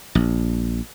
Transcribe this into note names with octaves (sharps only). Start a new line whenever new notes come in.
A#1